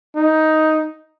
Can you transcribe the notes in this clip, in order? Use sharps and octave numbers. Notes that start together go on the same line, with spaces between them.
D#4